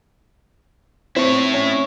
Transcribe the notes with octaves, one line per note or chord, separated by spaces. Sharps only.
C4 E4 C#5
C#4